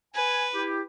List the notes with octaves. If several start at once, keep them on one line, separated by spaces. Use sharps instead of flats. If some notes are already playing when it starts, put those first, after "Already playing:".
B4 G#5
E4 G4